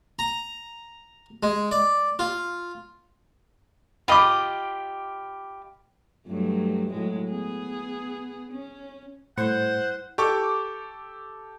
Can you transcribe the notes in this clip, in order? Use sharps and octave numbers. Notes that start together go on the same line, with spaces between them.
A#5
G#3
D5
F4
F4 G4 D#5 B5 D6
G2 F#3 A3
A2 F#3 G#3
B3 G#4
C#4
A2 G3 E4 C5 F#5
G4 A4 C#6 D6